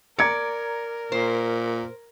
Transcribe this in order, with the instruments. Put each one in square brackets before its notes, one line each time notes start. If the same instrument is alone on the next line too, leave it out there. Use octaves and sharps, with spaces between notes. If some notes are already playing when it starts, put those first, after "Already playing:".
[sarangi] A#4 [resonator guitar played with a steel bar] D5 [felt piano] A#5 G#6 C#7
[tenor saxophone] A#2 [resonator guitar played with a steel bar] C5